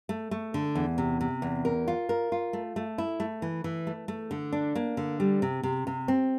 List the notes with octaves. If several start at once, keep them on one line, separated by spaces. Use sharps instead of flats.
A3
A3
D3
E2
C3
C3
E2
A#4
F4
A#4
F4
A3
A3
E4
A3
E3
E3
A3
A3
D3
D4
A#3
D3
G3
C3
C3
C3
C4